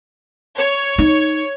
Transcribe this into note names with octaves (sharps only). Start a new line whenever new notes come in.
C#5
D#4